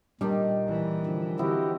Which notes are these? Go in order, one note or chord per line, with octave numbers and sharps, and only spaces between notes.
A#2 D#3 G3 D4 D#4
E3
D3 F3
C4 E4 F#4 G4 A#4 D#5